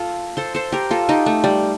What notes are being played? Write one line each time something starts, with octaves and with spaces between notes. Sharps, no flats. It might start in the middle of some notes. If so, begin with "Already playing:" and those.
Already playing: F4 A4
A4 C5
A4 C5
G4 A#4
F4 A4
D#4 G4
A3
G3